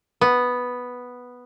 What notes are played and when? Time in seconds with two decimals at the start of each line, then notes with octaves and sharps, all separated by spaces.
0.21 B3